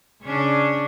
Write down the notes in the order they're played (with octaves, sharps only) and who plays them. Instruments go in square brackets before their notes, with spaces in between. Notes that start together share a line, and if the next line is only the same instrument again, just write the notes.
[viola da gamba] C#3 C#4 D4